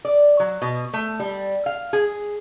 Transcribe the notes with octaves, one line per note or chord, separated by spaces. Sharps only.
D5
F#3
B2
A3
G3
F5
G#4